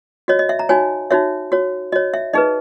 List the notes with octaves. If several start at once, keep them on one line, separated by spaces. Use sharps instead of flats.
F#4 C#5 D#5
D#5
E5
A#5
D#4 F#4 C#5 G#5
D#4 F#4 C#5 E5
F#4 C#5
F#4 C#5 D#5
E5
D#4 G#4 B4 D#5